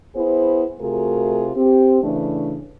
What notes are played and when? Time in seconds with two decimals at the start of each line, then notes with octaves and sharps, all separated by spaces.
0.15 B3 E4 G#4 C5
0.80 C3 A3 F4 F#4 G#4 A#4
1.56 C4 G4
2.03 C#3 E3 A3 D4